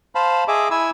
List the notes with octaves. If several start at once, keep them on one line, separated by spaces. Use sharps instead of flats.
C5 F5 A5 B5
G#4 D#5 E5 D6
E4 G#5 E6